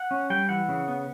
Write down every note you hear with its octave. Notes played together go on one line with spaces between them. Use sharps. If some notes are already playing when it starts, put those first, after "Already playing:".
Already playing: F#5
C#4
G3 G5
E3 F#5
C#3
B3